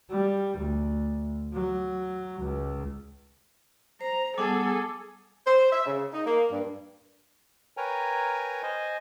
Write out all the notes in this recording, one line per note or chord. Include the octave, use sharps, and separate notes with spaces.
G3
D2
F#3
C#2
C5 A#5
G3 B3 G#4 A4 F#5 A5 D6
C5
E5
C#3
D#4
A#3
G2
A#4 B4 C#5 G5 G#5 A#5
C5 D#5 G#5